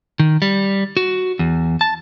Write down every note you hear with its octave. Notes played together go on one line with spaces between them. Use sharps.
D#3
G3
F#4
E2
A5